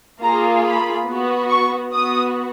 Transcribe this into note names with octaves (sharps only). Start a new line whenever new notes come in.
A#3 F4 G#4 A#5
B5
B3 F#4
C#6
B3 F#4 D#6